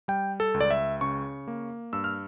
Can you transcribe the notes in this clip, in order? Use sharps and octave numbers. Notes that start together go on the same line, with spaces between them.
G3 G5
A4
C#2
D5
E5
C#3 C#6
A#3
G2 E6
F6